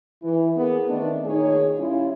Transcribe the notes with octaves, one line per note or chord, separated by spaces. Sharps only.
E3
A#3 B3 G#4
D#3 A3 C4 D4
A#2 D#3 D#4 G#4 C#5
G3 C#4 E4 F4